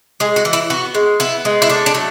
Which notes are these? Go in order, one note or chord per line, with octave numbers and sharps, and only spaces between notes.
G#3 G#4
F#4
E3
E4
B3 F#4
G#3
B3 E4
G#3
E4
A3 D4
D4
F#3